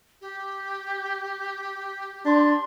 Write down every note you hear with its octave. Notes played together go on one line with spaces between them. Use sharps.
G4
D4 C6